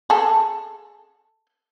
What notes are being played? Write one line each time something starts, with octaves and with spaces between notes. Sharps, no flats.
G#4 A4